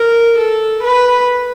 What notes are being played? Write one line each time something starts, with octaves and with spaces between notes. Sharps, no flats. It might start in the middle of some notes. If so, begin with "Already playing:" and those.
Already playing: A#4
A4
B4